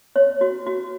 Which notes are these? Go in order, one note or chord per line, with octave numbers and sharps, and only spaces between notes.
C#5
F#4
F#4